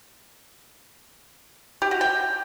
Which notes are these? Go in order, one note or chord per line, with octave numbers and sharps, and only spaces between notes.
G4
F#4
G5